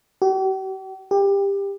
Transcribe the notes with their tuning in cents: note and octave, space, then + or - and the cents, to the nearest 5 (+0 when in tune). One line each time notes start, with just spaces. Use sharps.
G4 -45
G4 +20